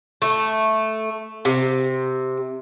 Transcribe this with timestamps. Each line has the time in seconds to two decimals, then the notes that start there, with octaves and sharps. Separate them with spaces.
0.22 A3
1.45 C3